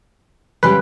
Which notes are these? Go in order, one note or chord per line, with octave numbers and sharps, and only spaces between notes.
C#3 G3 G#3 B4